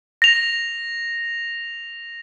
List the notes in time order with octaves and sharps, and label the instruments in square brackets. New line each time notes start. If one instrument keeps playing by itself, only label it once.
[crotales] A#6 F7